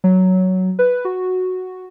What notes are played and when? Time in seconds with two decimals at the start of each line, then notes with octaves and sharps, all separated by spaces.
0.04 F#3
0.79 B4
1.05 F#4